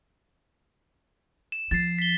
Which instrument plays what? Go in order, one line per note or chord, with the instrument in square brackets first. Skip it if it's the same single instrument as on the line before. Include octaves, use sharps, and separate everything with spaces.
[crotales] E7
[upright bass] F3 [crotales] A6 C7
[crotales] B6 G7